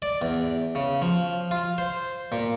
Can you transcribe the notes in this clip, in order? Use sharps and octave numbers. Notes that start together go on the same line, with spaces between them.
D5
E2
C#3
F3
F4
C5
A#2